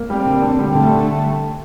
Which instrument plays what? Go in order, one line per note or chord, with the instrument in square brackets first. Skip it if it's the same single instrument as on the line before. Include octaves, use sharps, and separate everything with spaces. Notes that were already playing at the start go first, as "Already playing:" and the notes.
Already playing: [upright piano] A#3
[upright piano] G3 [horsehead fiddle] C4
[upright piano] D3
D3
G3
[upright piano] D3 [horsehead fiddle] A3